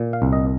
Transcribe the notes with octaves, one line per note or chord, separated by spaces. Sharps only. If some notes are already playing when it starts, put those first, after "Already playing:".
Already playing: A#2
F5
C2
D#5